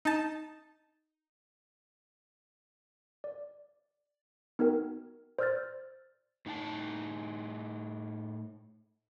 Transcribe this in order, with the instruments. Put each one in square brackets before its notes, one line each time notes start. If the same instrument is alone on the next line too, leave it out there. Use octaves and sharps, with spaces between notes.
[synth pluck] D#4 A5
[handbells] D5
B3 D#4 F#4 A#4 G5
C5 D5 E6 F6 G6 A6
[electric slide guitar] A2 D#4 F#5 A5